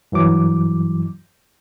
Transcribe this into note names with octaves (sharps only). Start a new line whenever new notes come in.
G2 E3 F#3 D6